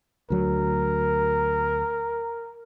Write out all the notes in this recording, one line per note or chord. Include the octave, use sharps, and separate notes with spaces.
D2 F#3 A#4